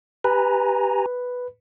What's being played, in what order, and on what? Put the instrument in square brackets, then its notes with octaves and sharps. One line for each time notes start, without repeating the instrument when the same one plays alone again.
[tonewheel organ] G4 G#5 A#5 [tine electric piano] B4